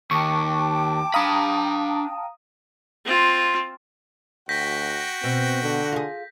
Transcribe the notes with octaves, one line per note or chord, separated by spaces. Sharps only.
D#2 G5 A5 C#6 D6
D4 F5 A#5 B5 D#6
C4 F4
D2 F#4 G5 G6 A#6 B6
B2 C4
D3
F4 G#4